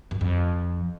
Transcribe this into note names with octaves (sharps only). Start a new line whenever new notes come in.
F#2
F2